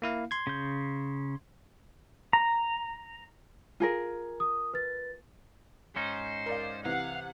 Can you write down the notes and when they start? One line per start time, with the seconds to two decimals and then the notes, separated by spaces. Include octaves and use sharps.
0.02 A#3 E4 F5
0.31 C6 G#6
0.47 C#3 G6
2.33 A#5
3.80 F4 G#4 A#4
4.40 D#6
4.74 B4 A6
5.96 G#2 C#4 D#4 C5
6.46 A#4 D5 F5
6.85 C3 E3 F5 F#5